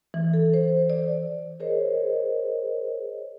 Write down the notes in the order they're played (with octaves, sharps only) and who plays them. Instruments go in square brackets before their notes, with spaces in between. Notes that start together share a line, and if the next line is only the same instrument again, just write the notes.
[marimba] E3
A4
C5
D5
[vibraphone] G#4 A#4 C5 C#5 D#5